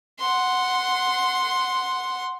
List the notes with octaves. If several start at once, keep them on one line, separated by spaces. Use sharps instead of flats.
F#5 C6